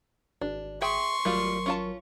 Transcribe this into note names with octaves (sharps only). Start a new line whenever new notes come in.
G#1 D4
G#4 E5 G5 C6 C#6
G#1 F#3 G3 A3 F4 A#4
C#4 F4 A5